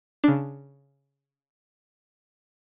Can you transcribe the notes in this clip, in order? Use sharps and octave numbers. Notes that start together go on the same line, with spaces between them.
C#3 D4